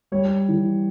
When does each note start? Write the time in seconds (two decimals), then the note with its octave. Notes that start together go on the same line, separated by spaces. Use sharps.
0.12 G3 C#5
0.49 E3